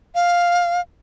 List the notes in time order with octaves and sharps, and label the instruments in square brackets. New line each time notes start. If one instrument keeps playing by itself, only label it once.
[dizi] F5